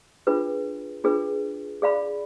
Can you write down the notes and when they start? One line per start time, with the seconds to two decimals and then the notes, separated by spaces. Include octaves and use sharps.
0.27 D4 F4 G#4 B4
1.04 D4 F4 G#4 B4
1.82 G#4 D5 F5 B5